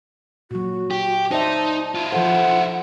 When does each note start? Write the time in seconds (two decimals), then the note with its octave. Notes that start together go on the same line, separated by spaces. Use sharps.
0.51 A#2 F#3 F#4
0.91 G4
1.31 D#4 C5 D5 E5 A5
1.95 E4 F4
2.12 F3 A4 C5 F#5